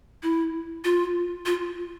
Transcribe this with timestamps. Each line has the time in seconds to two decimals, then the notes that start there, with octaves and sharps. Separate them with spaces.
0.23 E4
0.85 F4
1.46 F4